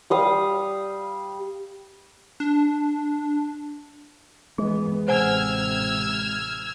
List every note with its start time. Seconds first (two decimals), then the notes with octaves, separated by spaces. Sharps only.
0.10 G3 F5 D#6
2.40 D4
4.58 E3 G#3 B3 G#4
5.08 A1 C3 C5 F#5 G#5 E6 F6 G#6